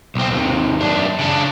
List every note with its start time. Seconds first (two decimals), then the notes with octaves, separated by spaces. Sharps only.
0.15 B1 C4
0.31 D#2 C3
0.81 F#2 D4
1.19 C#3 D4